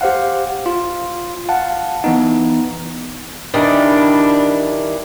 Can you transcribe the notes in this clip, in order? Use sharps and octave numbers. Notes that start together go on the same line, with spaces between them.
G4 C5 F5 F#5
F4
F5 F#5 A5
E3 B3 D#4
D#3 E3 G3 D4